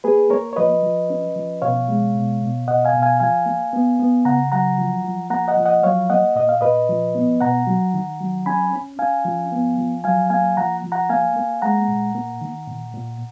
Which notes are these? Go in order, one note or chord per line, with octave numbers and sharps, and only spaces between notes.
A#3 G#4 B4
A#3 A#4 C#5
C#5
F3 B4 D#5
F3
C#4
F3
B2 C#5 F5
G#3
B2
B2
B2 D#5 F#5
F5 G#5
B2
F5 G#5
F3 F5 G#5
A#3
B3
B3
C#3 F#5 A#5
F#3 F#5 A#5
F3
F3
A#3 F#5 A#5
D#5 F#5
F3
D#5 F#5
F#3 C#5 F5
A#3 D#5 F#5
A#2 D#5
F5
A#2 B4 D#5
F3
B3
B2 F#5 A#5
F#3
D#3
F#3
C#4 G#5 B5
C#4
C#4 F5 G#5
F3
B3
F3
F#3 F5 G#5
A#3 F5 G#5
F3 F#5 A#5
F3
F#5 A#5
A#3 F5 G#5
A#3
G#3 F#5 A#5
A#2
A#3
D#3
A#2
A#2